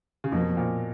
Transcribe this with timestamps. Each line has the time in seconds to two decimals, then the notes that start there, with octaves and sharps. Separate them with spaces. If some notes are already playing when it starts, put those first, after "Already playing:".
0.24 C#3
0.32 F2 B2 F3 A#3
0.57 A#2